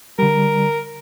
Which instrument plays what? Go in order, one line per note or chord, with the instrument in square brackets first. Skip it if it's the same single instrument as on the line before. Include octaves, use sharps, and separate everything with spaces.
[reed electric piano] D3 G3 [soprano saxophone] A#4